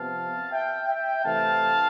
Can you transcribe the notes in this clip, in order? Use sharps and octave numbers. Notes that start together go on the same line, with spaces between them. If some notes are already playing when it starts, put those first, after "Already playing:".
Already playing: C3 F3 B3 F5 A5
E5 G5
E5 G5
C3 E3 A3 F5 A5